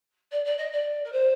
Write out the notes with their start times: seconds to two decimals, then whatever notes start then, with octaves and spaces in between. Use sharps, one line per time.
0.31 D5
0.45 D5
0.58 D#5
0.72 D5
1.04 A#4
1.12 C5